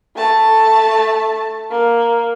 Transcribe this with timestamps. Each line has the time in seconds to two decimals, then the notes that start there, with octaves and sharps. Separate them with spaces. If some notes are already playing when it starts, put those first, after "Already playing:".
0.16 A3 A5
1.71 A#3